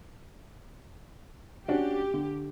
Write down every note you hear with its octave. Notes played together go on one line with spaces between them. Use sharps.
C#4 D4 F#4 G4
D3